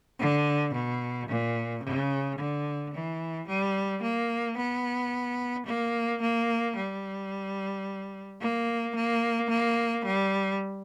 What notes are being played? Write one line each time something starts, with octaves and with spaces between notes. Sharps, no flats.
D3
B2
A#2
C#3
D3
E3
G3
A#3
B3
A#3
A#3
G3
A#3
A#3
A#3
G3